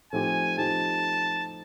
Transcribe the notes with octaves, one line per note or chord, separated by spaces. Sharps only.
F3 A3 C4 D#4 G4 G#5
F3 A3 C4 D#4 G4 A5